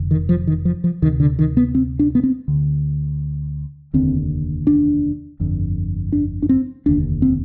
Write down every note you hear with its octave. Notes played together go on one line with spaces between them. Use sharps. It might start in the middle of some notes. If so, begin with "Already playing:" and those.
Already playing: F1 F2 D3
D#3
F3
D#3
F3
F3
D2 C3 D#3
D3
D#3
B3
C4
D4
B3
C4
D2 D3
F1 D#2 D3 C4
D4
G1 F2 D3
D4
D4
C4
F1 D#2 D3 D4
C4